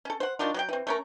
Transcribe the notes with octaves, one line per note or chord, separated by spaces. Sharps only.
C#4 A4
C5 F#5
D#3 F#3 D4 F4
F#3 G4 G5
E3 C4
A3 C#4 A#4